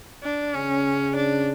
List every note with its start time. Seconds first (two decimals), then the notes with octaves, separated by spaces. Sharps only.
0.23 D4
0.54 C#3 C#4
1.16 D4